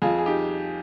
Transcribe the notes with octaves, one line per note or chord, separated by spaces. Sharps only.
F2 F4 G#4
G#4
D#4 G4